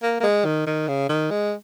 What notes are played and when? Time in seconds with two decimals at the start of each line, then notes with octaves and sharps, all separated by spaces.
0.03 A#3
0.20 A#3
0.23 G#3
0.45 D#3
0.67 D#3
0.88 C#3
1.09 D#3
1.31 G#3